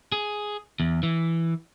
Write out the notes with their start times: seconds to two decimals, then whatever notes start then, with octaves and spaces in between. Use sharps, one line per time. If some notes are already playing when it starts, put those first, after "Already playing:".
0.12 G#4
0.80 E2
1.03 E3